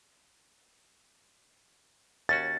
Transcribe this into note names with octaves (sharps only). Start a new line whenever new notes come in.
D#2 C#4 F#4 A6